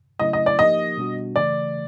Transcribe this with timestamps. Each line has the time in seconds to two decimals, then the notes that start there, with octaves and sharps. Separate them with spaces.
0.19 C#3 F#3 A3 C#4 E4 D#5
0.33 D#5
0.46 D5
0.59 F3 A#3 D#4 G4 A#4 D#5
0.97 B2 G3 B3 D4 F#4
1.36 C#3 E3 A3 D5